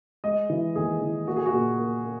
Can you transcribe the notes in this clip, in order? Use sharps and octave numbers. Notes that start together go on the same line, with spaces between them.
G#3 D#5
E3
D#2 G#4
E3
A#3 F#4
G#4
F#4
A#2
A#3
A#3